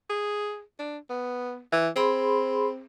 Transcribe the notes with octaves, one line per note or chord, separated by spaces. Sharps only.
G#4
D4
B3
E3
C4 G#4 B5 C6